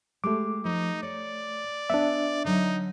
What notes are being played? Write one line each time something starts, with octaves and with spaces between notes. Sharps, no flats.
G#3 A3 G4 D6
F3 D#4
C#5 D5
B3 D4 E5 F#5 G#5
D3 F#3 D#4